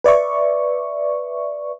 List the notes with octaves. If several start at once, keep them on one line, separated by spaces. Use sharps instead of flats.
B4 D5 E5 C#6